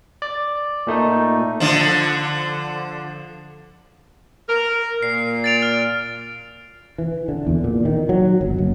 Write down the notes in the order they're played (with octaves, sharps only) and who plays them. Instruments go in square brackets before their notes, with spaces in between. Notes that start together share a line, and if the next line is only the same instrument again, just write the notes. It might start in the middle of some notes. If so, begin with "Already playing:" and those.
[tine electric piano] D5
A#2 A3 D#4
[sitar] D3 F3
[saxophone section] A#4
[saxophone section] A#2 [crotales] C7
[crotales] A6 D7 F7
F6
[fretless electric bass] E3
D3
E2
A#2
D#3
F#3
G1
F#1